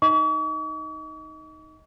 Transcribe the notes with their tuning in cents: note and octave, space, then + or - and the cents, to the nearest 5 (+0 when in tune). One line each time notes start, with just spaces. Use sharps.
D#4 +0 D#5 +20 C#6 +45